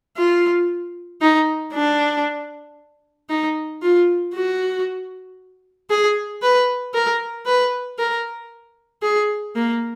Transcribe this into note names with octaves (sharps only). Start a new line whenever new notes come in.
F4
D#4
D4
D#4
F4
F#4
G#4
B4
A#4
B4
A#4
G#4
A#3